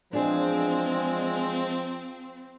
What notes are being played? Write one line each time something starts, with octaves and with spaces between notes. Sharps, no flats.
E2 F3 G#3 C4 D4 G#4